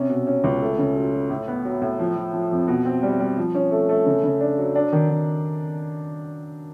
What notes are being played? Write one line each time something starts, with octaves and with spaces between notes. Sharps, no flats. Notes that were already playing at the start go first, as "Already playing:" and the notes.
Already playing: C3 C#4
B2
C#4
C#2
A3
C#3
F#3
F#3
A2
B3
F#3
A2
F3
F3
F3
F2
B2
C4
G3
G3
F3
C#4
A3
A3
C#3
C#3
D4
F#3
D4
D#3
D#3